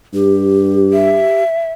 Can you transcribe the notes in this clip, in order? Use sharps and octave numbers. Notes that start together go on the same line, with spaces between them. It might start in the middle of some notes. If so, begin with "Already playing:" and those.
G2 G4
E5